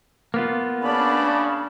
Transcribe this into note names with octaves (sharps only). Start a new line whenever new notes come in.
A#3 B3 F4
C#3 D4 B5